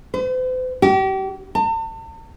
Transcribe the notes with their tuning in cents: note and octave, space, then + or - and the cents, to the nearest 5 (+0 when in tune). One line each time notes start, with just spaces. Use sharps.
C5 -45
G4 -35
A5 +45